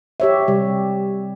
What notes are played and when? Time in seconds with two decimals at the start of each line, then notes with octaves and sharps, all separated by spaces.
0.20 G4 C#5 E5
0.48 C3 G3